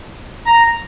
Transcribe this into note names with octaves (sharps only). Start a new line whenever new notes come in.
A#5